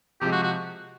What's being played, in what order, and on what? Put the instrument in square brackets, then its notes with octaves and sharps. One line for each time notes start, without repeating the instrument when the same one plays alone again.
[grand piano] C3 F3 G#3 [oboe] G4
[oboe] F#4
F#4